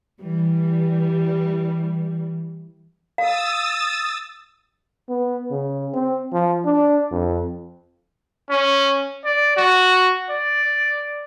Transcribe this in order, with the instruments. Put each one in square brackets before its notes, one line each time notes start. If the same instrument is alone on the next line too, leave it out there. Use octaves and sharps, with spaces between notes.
[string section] E3 G3
[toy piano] F5 [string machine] D#6 E6 A6
[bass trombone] B3
C#3
C4
F3
D4
F2
[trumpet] C#4
D5
F#4
D5